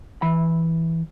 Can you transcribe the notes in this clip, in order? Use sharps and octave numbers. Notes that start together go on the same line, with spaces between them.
E3 B5